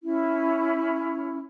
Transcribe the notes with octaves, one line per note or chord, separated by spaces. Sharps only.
C#4 E4